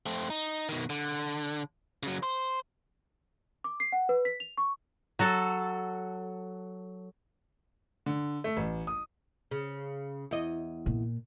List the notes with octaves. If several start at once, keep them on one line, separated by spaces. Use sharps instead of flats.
A3 C4
D#4
B2 D#3
D3
C#3 F#3
C5
D6
C7
F#5
B4
B6
F7
C#6
F#3 F#4 A4
D3
A3
A1
D#6
C#3
E2 D#5
A#2